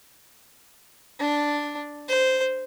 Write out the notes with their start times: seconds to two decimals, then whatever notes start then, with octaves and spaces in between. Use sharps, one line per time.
1.20 D4
2.08 C5